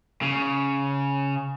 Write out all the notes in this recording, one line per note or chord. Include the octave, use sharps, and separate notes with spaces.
C#3